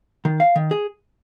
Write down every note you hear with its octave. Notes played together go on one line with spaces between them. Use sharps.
D#3
F5
D#3
G#4